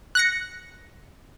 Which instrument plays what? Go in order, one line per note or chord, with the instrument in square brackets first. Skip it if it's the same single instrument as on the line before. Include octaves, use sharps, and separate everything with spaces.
[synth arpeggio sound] F#6 A#6 C#7